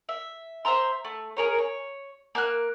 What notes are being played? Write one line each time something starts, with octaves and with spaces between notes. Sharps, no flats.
E5
C5 E5 A#5 C6
A3
G#4 A#4 C#5
C#5
A#3 F6 F#6